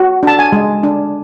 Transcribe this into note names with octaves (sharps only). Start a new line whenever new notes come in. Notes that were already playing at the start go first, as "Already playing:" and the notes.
Already playing: F#4
D4 A5
G#5
G#3
D4